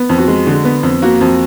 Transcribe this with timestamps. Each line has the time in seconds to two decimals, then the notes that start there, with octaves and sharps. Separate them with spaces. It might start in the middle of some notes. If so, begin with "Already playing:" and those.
Already playing: B3
0.09 F2
0.18 F#4
0.28 G#3
0.47 D3
0.65 B3
0.83 F2
1.02 A#3 F#4
1.21 F2